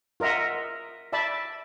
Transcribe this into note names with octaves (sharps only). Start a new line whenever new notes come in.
F4 A#4 D#5 E5 F#5
D5 E5 A5 B5